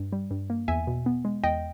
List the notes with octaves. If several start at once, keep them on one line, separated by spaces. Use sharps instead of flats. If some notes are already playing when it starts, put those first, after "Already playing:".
Already playing: G2
G3
G2
A#3
E2 E5 G#5
B2
B3
G#3
E2 D#5 G5